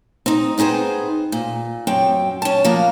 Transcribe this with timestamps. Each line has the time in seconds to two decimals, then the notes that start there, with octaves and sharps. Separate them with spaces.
0.26 C4 D#4
0.58 B3 C4 D#4 G#4 C5
1.32 A#2
1.87 F#2 C4 G5
2.42 C#4 A5
2.64 F3 F#3 A#3 F5